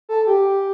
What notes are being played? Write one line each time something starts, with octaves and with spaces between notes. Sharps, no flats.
A4
G4